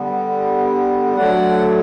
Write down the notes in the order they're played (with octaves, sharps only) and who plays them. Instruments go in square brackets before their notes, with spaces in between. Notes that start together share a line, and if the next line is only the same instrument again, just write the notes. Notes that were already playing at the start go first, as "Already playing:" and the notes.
Already playing: [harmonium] D3 G3 B3
D3 F#3 A3 D5 F#5